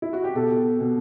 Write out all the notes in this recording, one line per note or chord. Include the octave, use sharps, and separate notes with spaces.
E4
F#4
G4
B2 A4
B2